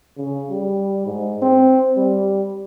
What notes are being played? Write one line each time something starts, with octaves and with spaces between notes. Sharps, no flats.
C#3
G3
G#2
C4
G3